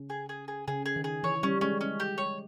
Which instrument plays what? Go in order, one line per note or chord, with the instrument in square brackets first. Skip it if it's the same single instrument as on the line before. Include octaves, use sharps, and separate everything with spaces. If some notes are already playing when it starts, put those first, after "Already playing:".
Already playing: [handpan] C#3
[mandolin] G#4
G#4
G#4
[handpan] C#3 [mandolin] G#4
[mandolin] G#4
[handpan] D#3
[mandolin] G#4
[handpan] E3 [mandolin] C#5
[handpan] G3 [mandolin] C#4
[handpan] G#3 [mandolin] C#4
[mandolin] C#4
G4
C#5